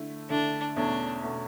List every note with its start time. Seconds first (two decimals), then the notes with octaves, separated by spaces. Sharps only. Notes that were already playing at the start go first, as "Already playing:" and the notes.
Already playing: D3 A3 E4
0.30 D3 A3 D4 E4
0.76 E2 B2 A3 C#4 D4
1.23 B2 A3 C#4